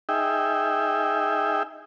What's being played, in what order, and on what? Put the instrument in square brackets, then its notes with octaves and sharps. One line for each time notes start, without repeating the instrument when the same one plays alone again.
[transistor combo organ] D#4 G#4 E5 G5